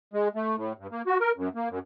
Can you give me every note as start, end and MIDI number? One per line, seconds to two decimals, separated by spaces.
0.13 0.28 56
0.35 0.56 57
0.56 0.73 45
0.78 0.87 43
0.91 1.02 58
1.07 1.18 66
1.20 1.32 70
1.37 1.49 42
1.55 1.69 58
1.69 1.79 42